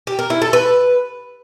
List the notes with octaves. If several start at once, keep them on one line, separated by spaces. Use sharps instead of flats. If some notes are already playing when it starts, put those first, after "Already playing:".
G4
A#4
E4
A4
B4